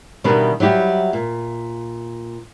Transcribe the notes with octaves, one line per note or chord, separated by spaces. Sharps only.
B2 D#3 G3 D4 E4 B4
F#3 G3 E4 G4
A#2